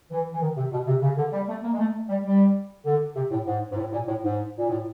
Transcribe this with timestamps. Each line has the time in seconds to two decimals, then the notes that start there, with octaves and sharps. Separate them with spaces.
0.11 E3
0.33 E3
0.41 D#3
0.57 C3
0.72 B2
0.87 C3
1.02 C#3
1.17 D3
1.32 G3
1.49 A3
1.64 A#3
1.74 G#3
1.79 A3
2.09 G3
2.25 G3
2.85 D3
3.16 C3
3.31 A2
3.46 G#2
3.72 G#2
3.77 A2
3.93 A#2
4.08 A2
4.23 G#2
4.58 A#2
4.69 A2